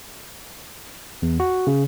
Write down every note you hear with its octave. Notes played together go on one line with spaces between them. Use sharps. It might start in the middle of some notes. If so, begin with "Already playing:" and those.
E2
F#4
C#3